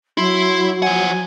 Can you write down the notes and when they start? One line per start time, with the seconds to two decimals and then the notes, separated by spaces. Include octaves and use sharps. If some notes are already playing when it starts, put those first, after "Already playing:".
0.18 F#3 E4 C6
0.82 F3 F#5 G#5